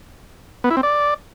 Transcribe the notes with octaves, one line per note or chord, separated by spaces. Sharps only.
B3
E4
C4
D5